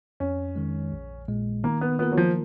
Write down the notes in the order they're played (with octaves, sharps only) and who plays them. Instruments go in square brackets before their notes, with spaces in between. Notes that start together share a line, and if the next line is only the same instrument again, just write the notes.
[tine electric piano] F2 [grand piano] C#4
[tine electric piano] D#3 G#3
A#1
A#2 G#3
[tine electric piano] D#3 [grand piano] A#3
[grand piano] B3
[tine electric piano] A#3 F4 A#4 [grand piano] B3
[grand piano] F#3
F3